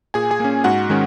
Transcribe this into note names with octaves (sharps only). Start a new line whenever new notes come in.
A#2 G#4 G#5
G#4 G#5
A#3 C#4
G#2 F#4 F#5
D#3 G#3 C#4